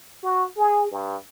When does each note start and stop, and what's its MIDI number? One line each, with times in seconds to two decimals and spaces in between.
0.23 0.45 66
0.57 0.89 68
0.92 1.16 43